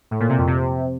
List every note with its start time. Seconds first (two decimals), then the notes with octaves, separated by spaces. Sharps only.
0.11 A2
0.20 A#2
0.29 C3
0.38 F2
0.47 C3